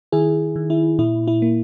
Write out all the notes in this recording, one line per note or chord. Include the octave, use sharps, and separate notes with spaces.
D#3 E4 G#4
D#3
E4
A#2 E4
E4
A#3